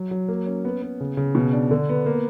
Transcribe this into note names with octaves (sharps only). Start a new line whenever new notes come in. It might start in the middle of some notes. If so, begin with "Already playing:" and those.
Already playing: F#3
F#3
A#3
C#4
B3
B3
C#3
C#3
B2
D4
D3
B3
A#3